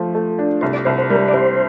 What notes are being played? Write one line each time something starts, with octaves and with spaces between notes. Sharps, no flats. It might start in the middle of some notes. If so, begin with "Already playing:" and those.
Already playing: F3 A3
A3
D4
C2 C5
D5
C2 C5
C5
G3 A#4
D5
C2 C5